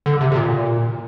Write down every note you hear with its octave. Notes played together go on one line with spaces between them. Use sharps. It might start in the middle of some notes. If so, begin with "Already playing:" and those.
D3
C3
C3
A#2